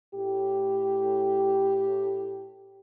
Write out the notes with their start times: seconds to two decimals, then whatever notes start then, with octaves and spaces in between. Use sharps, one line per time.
0.14 A2 G4